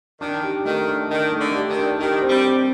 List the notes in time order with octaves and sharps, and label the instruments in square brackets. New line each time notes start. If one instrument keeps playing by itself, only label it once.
[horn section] D#3 [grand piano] D4
[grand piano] G4
[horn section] D#3 [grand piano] A3
[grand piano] D4
[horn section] D#3 [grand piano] D4
[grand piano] A3
[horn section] D3
[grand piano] G4
[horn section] D#3
[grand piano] D4
[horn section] D#3 [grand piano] G4
[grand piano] C4
[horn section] G3
[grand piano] C4